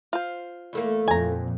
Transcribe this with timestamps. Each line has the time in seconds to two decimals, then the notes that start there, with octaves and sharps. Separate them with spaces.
0.13 F4 C5
0.73 E2 A3 A#3
1.08 F2 A#2 G#5 A#5